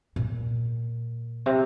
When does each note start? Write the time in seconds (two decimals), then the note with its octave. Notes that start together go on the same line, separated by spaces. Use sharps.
0.16 A#2
1.46 C3